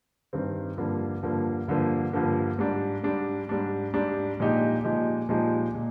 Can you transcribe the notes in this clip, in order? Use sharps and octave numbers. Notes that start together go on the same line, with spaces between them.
G2 D#3 G3 C4
G2 D3 F3 A#3
G2 D3 F3 A#3
G2 D3 F3 A#3
G2 D3 F3 A#3
G#2 G3 D4
G#2 G3 D4
G#2 G3 D4
G#2 G3 D4
A#2 F3 G#3 D#4 G4
A#2 F3 G#3 D#4 G4
A#2 F3 G#3 D#4 G4
A#2